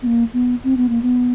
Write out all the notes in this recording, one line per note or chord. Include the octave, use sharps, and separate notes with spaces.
B3
A#3
B3
C4
B3
A#3
B3